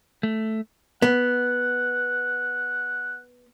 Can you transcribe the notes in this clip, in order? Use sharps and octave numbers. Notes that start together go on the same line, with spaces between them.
A3
B3 F#5